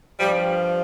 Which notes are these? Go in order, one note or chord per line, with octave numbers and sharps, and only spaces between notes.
G2 F3 G3